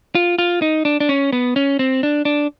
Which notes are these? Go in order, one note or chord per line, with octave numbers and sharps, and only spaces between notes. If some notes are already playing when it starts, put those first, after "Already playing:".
F4
F4
D#4
D4
D4
C#4
B3
C#4
C4
D4
D4